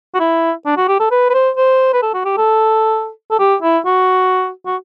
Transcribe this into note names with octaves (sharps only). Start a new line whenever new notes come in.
F#4
E4
D4
F#4
G4
A4
B4
B4
C5
C5
B4
A4
F#4
G4
A4
A4
G4
E4
F#4
F#4